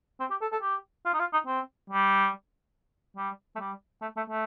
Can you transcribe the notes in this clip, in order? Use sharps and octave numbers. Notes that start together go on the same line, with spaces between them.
C4
G4
A4
A4
G4
F4
D#4
F4
D#4
C4
G3
G3
A3
G3
A3
A3
A3